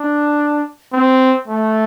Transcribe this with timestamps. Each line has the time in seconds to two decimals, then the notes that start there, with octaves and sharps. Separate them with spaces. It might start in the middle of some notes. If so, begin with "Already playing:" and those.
Already playing: D4
0.93 C4
1.48 A3